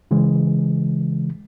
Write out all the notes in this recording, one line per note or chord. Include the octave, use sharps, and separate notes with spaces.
C#3 E3 G#3